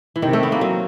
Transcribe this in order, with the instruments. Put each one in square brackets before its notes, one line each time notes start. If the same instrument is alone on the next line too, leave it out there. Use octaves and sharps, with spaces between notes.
[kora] E3
[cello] C3 [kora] D#3
[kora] A3
B3
A#3
F#3